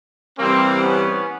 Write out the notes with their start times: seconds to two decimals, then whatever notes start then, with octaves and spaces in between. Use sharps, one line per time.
0.39 C3 E3 G3 A#3 C4
0.81 B3 C#4